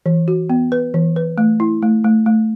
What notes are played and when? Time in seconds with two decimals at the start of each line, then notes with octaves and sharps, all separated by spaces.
0.06 E3
0.28 F#4
0.50 B3
0.72 B4
0.94 E3
1.16 B4
1.38 A3
1.60 E4
1.82 A3
2.04 A3
2.26 A3